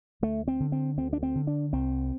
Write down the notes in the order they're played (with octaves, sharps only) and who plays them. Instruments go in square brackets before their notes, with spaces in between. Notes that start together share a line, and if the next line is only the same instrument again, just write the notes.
[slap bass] D2 A3
C4
D3
C4
D2 C4
D4
C4
D3
D4
C2 C4